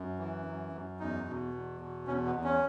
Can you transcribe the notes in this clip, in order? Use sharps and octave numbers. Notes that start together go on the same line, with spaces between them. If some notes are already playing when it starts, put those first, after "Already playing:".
Already playing: F#2
E3
F#2
F#2
E2 D#4
B2
E2
B2
E2 C#4
B3
E2
C#4